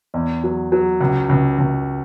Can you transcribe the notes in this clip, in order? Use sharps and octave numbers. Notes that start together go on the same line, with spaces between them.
E2
F#3
F#3
C#2
C#2
C#2